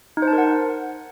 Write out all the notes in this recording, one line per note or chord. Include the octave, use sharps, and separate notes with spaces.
D#4
C5
A5
A#4
F#5